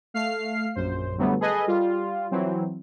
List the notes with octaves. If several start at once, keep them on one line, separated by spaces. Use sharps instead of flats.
A3 F5 F6 C7
A#1 F#2 C5
D3 F#3 G3 A3 B3
G#4 A4 B4 D#5 G#5
G3 F4
E3 F#3 C4